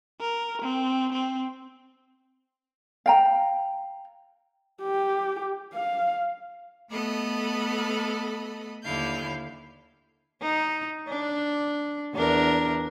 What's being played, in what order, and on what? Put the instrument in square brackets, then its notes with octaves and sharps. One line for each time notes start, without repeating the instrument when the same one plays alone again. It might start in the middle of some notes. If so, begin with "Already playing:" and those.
[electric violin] A#4
C4
C4
[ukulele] F5 G5 A#5
[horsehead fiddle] G4
F5
[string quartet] A3 B3 A4 D#5 B5
D#2 D3 E4 F5 G6
[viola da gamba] D#4
D4
E2 D4 A#4